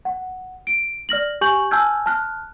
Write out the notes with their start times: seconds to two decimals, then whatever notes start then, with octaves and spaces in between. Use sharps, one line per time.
0.05 F#5
0.67 D7
1.09 D5 F6 A#6 F#7
1.41 G4 G#5 C#6 G6 F#7
1.71 G#5 A5 E6 F6 G6 G#6
2.06 A5 F6 F#6